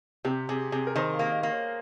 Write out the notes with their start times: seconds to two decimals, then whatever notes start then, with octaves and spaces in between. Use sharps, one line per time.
0.25 C3 G4
0.49 C3 G#4
0.72 C3 G#4
0.87 A#4
0.96 D#3 C5
1.14 F5
1.19 A#3
1.31 D#5
1.43 A#3
1.50 C#5